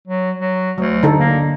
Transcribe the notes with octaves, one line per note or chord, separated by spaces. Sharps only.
F#3
F#3
D2 F#3
D3 D#4 A4
A#3